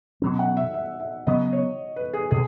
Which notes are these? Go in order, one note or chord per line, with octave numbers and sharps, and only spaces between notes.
B2 F#3 C#4
F#5
E5
E5
E5
C#3 F#3 B3 D#5
C#5
B4
G#4
B2 G#4